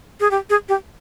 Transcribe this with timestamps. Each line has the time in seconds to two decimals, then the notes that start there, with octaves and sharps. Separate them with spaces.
0.20 G#4
0.31 G4
0.50 G#4
0.69 G4